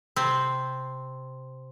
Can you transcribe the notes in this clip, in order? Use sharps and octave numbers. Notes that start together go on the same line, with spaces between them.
C3 C4